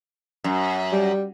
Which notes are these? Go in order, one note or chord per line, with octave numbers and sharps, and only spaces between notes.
F#2
G3